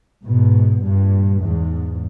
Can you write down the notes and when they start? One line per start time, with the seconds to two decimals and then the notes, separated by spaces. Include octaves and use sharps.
0.25 G#2 B2
0.84 G2 A#2
1.43 E2 G#2